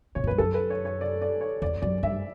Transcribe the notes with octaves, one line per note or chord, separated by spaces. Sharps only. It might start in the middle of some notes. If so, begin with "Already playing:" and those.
B2 C#5
A2
G2 B4
F#2 A4
B4
C#5
C#5
D5
D5
C#5
E2 D5
F#2 D5
G2 E5